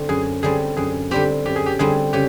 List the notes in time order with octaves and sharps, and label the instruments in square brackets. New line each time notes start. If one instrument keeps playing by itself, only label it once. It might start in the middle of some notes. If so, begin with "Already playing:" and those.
Already playing: [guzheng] D3 C4
[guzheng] F#2 [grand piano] G#4
[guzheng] D3 G3 C4 [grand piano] G#4
[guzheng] F#2 [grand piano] G#4
[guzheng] D3 G3 C4 [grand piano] G4
[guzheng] F#2 [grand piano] G4
[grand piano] G#4
G4
[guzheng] D3 G3 C4 [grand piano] G#4
[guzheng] C#3 [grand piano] G4